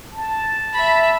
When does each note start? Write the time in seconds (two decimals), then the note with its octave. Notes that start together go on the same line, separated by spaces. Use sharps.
0.12 A5
0.73 E5 B5